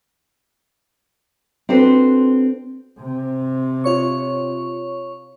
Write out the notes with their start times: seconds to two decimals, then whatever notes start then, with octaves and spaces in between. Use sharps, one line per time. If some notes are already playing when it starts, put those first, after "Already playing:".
1.69 C4 D4 F#4 A4 B4 C5
3.00 C3
3.84 F4 C#5 C#6